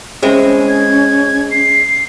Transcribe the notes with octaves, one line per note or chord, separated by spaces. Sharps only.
G#3 C4 C#4 E4
C#4
G#6
C7